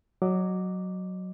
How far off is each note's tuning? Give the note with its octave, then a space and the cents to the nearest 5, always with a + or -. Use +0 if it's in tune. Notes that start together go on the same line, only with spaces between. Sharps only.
F#3 +0 D#5 -25 D6 +0